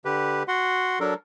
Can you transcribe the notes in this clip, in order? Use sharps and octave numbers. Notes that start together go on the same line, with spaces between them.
D3 G4 B4
F#4 F#5 C6
F#3 D4 A4 A#4